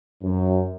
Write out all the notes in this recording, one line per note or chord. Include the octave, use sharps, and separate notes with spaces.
F#2